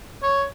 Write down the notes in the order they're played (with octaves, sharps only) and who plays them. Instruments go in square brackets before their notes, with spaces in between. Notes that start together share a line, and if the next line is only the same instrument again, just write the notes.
[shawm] C#5